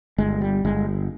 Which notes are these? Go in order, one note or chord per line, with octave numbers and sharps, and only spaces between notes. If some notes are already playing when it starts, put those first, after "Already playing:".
G1 G#3
G3
G1 G#3